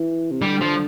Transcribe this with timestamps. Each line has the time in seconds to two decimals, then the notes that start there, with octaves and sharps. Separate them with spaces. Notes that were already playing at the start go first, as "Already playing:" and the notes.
Already playing: E3
0.31 C3
0.41 D3 G3
0.61 F3